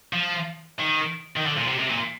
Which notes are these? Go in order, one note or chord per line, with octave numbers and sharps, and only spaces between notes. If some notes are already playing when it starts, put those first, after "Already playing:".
F3
D#3
D#3
D3
A#2
C3
C3
A#2